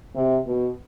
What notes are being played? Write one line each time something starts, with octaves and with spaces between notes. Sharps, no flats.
C3
B2